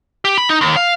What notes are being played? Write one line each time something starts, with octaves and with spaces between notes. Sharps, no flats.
G4
B5
D#4
D#2
F5